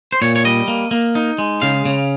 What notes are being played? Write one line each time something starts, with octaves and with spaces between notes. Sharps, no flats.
C5
A#2 C#5
C#5
G3 D#5
A#3
A#3
D#4
G#3
C#3 F5
C#3